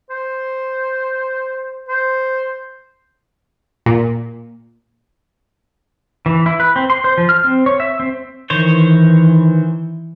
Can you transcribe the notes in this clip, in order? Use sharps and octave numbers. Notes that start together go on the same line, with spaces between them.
C5
C5
A#2
E3
E4
B4
C4
C6
C5
F3
F6
C4
C#5
E5
C4
D#3 E3 C5 C#5